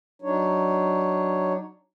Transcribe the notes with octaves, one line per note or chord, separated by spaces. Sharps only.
F#3 D4 D#4 C#5